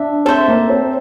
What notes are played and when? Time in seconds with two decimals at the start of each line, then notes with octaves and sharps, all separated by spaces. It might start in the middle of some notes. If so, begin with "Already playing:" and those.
Already playing: D4 E5
0.25 C4 A4 C5 E5
0.48 A#3
0.69 C4